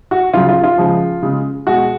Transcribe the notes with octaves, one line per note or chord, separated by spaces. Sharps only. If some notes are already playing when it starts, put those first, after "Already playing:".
F#4
C#3 F#3 F4
F4
F4
C#3 F3 G#3
C#3 G#3
B2 G#3 F#4